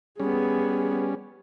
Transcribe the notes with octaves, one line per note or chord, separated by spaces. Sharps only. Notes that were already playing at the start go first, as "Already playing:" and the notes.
G3 B3 C#4 G#4